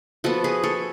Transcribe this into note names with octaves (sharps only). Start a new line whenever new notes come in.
F3 B3 F#4 A4
G#4 B4
A4 C#5